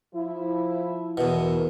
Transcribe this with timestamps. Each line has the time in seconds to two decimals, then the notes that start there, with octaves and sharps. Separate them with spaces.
0.14 F3 E4
1.17 E2 B2 E4 A#4